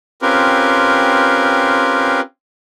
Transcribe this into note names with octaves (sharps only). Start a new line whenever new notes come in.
C4 C#4 F4 G4 A#4 B4